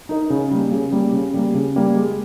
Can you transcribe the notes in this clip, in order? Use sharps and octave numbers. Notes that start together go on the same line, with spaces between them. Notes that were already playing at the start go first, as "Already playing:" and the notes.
D#4 A#4 D#5
C#3
G3 A#3
C#3
G3 A#3
C#3
G3 A#3
C#3
G3 A#3
G#3